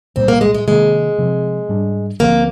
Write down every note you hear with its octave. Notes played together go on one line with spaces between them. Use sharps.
C2 A#2 G3 C4
A#3
G#3
G#3
C3 D#3 G#3 A#3
C3 F3 C4
G#2 G3 D4
D2 D3 F3 A#3 C4